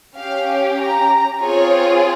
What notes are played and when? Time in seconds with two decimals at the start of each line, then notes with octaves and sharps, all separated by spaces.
0.16 C#4 G4 F5
0.78 A#5
1.40 C4 F4 G#4 C#5